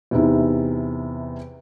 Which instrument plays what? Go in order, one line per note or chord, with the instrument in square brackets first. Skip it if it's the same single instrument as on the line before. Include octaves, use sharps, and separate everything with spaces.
[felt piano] E2 C3 D#4 E4